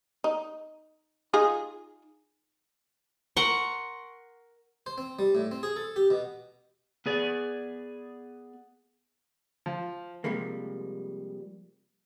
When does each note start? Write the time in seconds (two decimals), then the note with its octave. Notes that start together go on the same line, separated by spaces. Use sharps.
0.24 D#4
1.33 D#4 F4 G#4
3.37 A#4 F#5 C6 C#6
4.86 C5
4.98 C4
5.19 G3
5.35 A2
5.51 C4
5.63 G#4
5.76 A4
5.96 G4
6.10 B2
7.06 B3 G#4 D5
9.66 F3
10.24 C3 F3 G3 G#3 A#3